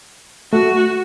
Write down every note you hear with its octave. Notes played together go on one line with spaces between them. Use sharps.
A3 F#4